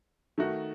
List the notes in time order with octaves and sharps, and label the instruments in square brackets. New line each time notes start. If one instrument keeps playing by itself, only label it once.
[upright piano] D#3 A3 D#4 F#4